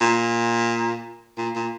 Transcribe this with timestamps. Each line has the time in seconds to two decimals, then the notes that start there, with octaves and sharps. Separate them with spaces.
0.01 A#2
1.38 A#2
1.55 A#2